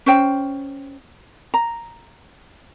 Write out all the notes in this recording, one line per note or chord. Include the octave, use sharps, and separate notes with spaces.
C#4 C5 G5
A#5